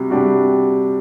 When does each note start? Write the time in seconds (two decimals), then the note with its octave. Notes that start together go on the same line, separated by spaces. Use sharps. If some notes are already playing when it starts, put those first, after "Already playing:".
Already playing: C3 G3 F#4
0.10 C3 G3 D4 F#4